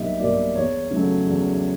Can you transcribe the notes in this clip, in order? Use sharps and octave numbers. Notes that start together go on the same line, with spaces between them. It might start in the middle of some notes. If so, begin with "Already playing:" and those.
Already playing: B1 B2 G3 A#3 D#5 E5
B2 G3 A#3 D5
E2 C#5
C#3 F#3 A3
E2